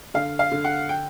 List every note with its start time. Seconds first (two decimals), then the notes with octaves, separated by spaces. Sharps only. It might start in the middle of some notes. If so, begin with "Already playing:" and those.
0.14 D3 F5
0.39 F5
0.52 D3
0.64 F#5
0.89 G5